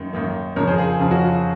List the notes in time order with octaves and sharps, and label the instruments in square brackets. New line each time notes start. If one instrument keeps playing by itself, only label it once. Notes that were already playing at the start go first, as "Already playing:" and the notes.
Already playing: [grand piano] F#2 D#3 A#3
F#2 D#3 A#3
F2 C#3 F3 A#4 C#5
G#4 C5
F4 G#4
F2 C#3 F3 F4
F#4
F4